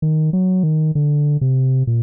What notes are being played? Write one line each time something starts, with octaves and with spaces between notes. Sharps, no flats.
D#3
F#3
D#3
D3
C3
A#2